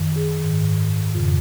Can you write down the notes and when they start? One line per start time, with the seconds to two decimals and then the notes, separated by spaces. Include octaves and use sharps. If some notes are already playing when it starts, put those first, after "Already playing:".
Already playing: F#2 D#3
0.16 G#4
0.40 G#2 D#3
1.15 F2 C#3